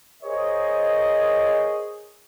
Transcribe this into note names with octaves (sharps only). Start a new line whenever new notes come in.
G#4 A#4 C5 C#5 D#5